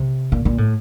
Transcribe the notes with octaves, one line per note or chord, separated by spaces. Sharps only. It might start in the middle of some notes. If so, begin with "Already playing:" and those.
Already playing: C3
A#2
A#2
A2